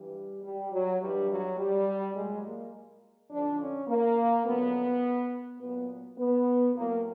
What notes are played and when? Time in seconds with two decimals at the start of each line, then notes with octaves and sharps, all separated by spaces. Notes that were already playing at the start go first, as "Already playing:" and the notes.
Already playing: G2 E3 G3
0.43 G3
0.72 F#3
1.01 G2 E3 G3
1.30 F#3
1.58 G3
2.15 A#2 F#3 G#3
2.45 A#3
3.30 F2 D3 F3 D4
3.59 C#4
3.88 A#3
4.45 F#2 D3 F3 B3
5.60 A#2 F#3 B3
6.18 B3
6.75 A2 F#3 A#3